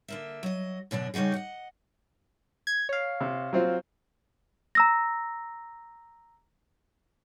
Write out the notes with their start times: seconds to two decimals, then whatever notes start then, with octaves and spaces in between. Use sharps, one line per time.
0.08 D3 A#3 E5
0.43 F#3 D#5
0.91 F#2 B2 D3 D4
1.14 C#3 G3 D#4 F#4 G#4
1.34 D#5 F#5
2.67 G#6
2.89 C#5 F5
3.21 C3
3.53 F#3 C4 F4
4.75 A#5 E6 A#6